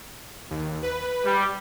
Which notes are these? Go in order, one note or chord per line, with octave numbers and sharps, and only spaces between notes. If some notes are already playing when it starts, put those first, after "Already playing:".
D#2
B4
G3